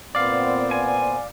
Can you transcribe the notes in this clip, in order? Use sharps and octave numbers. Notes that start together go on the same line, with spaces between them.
A#2 B3 C4 D5 F5
G#5